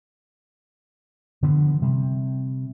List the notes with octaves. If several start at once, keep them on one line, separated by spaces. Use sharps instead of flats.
D3 E3 F3 B3
C3 G3